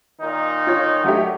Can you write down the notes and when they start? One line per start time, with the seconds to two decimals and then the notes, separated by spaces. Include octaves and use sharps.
0.21 A#2 D#3 D#4
0.67 F4 C#5
1.04 F#3 A3 G4